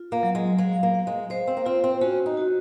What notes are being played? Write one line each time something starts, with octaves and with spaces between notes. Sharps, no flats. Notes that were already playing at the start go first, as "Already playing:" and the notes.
Already playing: F4
A#3
F#3
G#3
G#3 F5
A#3
F5
G#3
G#3 C5
C4
A#3
C4 F4
C4
C#4 F#4
D#4
F#4